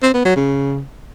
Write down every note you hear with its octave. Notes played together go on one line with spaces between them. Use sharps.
C4
B3
F#3
C#3